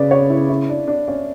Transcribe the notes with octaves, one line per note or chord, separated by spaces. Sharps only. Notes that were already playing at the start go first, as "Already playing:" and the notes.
Already playing: C#3 B4 D5
C#5
E4
E4
D4
D4
C#4